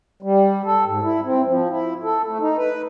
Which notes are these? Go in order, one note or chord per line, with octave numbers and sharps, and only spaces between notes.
G3
A4
G#2
E4
C4
F3
E4
A4
A3
D#4
B4